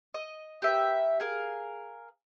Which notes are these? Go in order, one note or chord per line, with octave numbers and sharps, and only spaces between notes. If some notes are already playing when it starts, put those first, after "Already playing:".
D#5
G4 A#4 B4 E5
G#4 A#4 F5